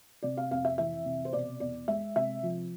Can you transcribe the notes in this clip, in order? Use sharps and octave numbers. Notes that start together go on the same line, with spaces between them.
C3 D5
F5
F2 F5
E5
E3 E5
C3
C5
B2 D5
E2 D5
G#3 E5
C3 E5
F3